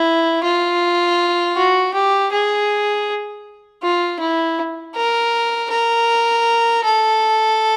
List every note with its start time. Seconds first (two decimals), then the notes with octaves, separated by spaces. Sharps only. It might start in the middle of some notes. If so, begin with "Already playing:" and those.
Already playing: E4
0.44 F4
1.56 F#4
1.94 G4
2.32 G#4
3.83 F4
4.20 E4
4.96 A#4
5.71 A#4
6.85 A4